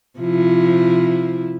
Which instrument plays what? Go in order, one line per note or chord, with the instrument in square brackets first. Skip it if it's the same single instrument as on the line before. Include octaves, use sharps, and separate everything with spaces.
[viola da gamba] C3 F3 E4